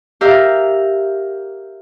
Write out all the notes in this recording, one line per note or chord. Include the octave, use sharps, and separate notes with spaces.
G4 A#4 E5 F5